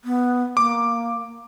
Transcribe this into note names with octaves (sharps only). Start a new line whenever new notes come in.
B3
A#3 D6